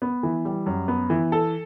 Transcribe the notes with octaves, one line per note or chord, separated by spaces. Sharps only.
B3
E3
G3
F#2
B3
E3
A4